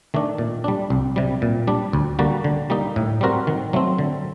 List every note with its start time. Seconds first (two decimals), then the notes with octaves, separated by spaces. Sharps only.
0.14 D#3 A3 D4
0.38 A#2
0.64 G3 D4
0.90 C2
1.16 C3 G3
1.42 A#2
1.67 G3 D4
1.93 D2
2.19 D3 G3 A#3 F#4
2.44 D3
2.70 G3 A#3 D#4
2.96 A2
3.21 G3 C4 F#4 A#4
3.47 D#3
3.73 F#3 A3 C4
3.99 D3